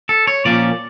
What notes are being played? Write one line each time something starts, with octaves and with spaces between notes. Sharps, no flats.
A4
C#5
A#2 F3 A#3 C#4 D5